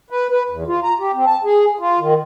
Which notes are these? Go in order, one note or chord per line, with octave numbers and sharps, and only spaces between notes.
B4
B4
E2
F4
A#5
G4
C4
A5
G#4
F4
D#3